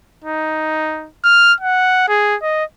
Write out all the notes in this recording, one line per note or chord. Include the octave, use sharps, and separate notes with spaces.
D#4
F6
F#5
G#4
D#5